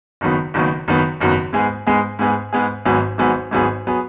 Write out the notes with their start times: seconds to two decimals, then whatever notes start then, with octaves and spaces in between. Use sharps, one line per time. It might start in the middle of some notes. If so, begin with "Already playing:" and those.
0.21 F#1 F#2 D#3 F#3 B3
0.54 F#1 F#2 D#3 F#3 B3
0.88 F#1 F#2 D#3 F#3 B3
1.21 F#1 F#2 D#3 F#3 B3
1.53 G#2 G#3 B3 G#4
1.87 G#2 G#3 B3 G#4
2.19 G#2 G#3 B3 G#4
2.53 G#2 G#3 B3 G#4
2.85 G#1 G#2 F#3 B3 G#4
3.18 G#1 G#2 F#3 B3 G#4
3.51 G#1 G#2 F#3 B3 G#4
3.87 F#3 B3 G#4